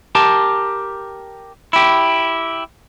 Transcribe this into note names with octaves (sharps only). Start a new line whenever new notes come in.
G4 A#4 A5
E4 G4